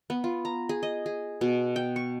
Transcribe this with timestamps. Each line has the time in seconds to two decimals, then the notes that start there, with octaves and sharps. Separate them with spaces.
0.10 B3
0.24 F4
0.45 A#5
0.69 G#4
0.83 D#5
1.06 G#4
1.41 B2
1.76 G5
1.96 C#6